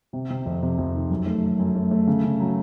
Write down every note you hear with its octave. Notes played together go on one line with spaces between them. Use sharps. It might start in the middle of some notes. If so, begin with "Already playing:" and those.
C3
C3
F2
C3
F2
D#3
F#2
A3
F#3
F#2
A3
A3
C#3
C#3
F#3